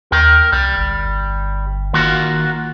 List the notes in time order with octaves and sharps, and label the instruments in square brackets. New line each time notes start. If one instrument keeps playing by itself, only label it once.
[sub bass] D#2 [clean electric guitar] A#4 G5
[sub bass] C2 [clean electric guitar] G3
[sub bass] G1
[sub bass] D#3 [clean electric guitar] A#3 F4 F#4